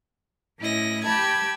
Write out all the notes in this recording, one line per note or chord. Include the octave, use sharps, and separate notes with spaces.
A2 C#4 E4 D#5 A#6
G4 G5 A5 B5 G#6